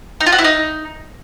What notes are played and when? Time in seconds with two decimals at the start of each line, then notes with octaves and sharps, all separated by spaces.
0.20 D#4
0.26 F4
0.32 F#4
0.38 E4
0.44 D#4